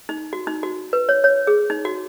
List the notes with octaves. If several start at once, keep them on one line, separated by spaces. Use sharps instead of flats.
D#4
F#4
D#4
F#4
B4
C#5
C#5
G#4
D#4
F#4